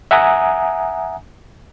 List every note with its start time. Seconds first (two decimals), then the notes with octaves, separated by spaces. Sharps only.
0.11 E5 F#5 G#5 A#5 D#6